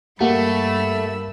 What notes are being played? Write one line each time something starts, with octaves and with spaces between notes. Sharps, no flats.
G2 A3 A#3 G4 F#5 B5 E6